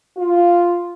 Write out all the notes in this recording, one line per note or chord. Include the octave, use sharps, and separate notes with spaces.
F4